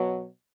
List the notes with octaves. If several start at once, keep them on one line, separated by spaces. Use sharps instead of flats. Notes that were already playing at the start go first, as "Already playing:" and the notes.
Already playing: B2 F#3